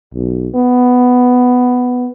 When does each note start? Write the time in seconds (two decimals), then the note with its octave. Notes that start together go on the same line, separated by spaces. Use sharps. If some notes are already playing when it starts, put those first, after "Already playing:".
0.14 B1
0.55 B3